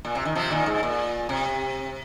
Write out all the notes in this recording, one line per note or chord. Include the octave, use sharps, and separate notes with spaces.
A#2
C3
D#3
C3 F3
A#2 D#3
G#2
A#2
C3